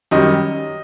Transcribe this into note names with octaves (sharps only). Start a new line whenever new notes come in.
F#2 D#3 G3 D#5